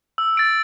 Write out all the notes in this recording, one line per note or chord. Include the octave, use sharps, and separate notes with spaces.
E6
A6 D7